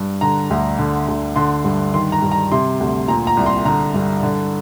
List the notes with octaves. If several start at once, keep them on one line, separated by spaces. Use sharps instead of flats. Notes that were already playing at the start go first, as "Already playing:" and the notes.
Already playing: G2
D3 A#5
D2
D3
D2
D3 C6
G2
D#3 C6
A#5
G2
A#5
C3 C6
D2
A#2 A#5
A#5
C2
C6
D3 A#5
G2
D3